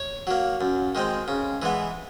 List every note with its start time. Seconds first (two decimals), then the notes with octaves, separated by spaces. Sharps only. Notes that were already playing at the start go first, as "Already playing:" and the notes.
Already playing: C#5
0.27 F#3 A#3
0.61 F#2
0.95 D#3 G#3 C4
1.28 C#3
1.62 E3 G#3 B3